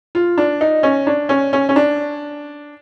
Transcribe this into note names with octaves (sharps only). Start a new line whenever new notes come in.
F4
D4
D#4
C#4
D4
C#4
C#4
C#4
D4